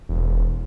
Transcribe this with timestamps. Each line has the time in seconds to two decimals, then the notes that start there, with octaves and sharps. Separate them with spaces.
0.09 E1